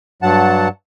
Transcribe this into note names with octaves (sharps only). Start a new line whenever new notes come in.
G2 F#3 F#5 A5